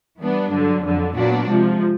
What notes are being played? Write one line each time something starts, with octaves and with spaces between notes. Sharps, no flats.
E3 G3 B3 D4
G2 D3 F#3
F2 D3 F#3
A#2 F#3 B3 D4 F#4
C3 F3 G#3